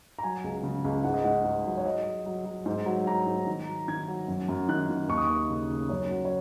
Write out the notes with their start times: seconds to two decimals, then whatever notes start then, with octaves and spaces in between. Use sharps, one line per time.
0.19 A#5
0.23 F#3 G#5
0.44 C#2
0.63 C#3
0.84 C#2
1.04 G#2 F#5
1.14 D#5
1.24 G#2 F#5
1.44 G#2
1.65 F#3
1.77 C#5
1.85 F#3 D#5
2.06 F#3
2.26 F#3
2.45 F#3
2.66 G#2
2.86 F#3
3.07 F#3 A#5
3.26 G#2
3.47 D#3
3.68 F#3
3.88 D#3 G#6
4.08 F#3
4.27 F#2
4.48 F#2
4.69 D#3 F#6
4.89 D#3
5.08 D#2 C#6
5.17 D#6
5.27 D#2 C#6
5.49 C#3
5.70 C#3
5.89 F#2 C#5
6.11 F#3
6.25 C#5